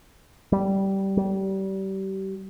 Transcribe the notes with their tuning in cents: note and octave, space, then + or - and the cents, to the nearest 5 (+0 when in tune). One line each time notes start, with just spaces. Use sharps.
G3 -15
G3 -30